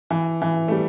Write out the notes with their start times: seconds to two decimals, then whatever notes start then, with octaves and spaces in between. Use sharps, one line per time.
0.10 E3
0.42 E3
0.68 A3
0.72 G3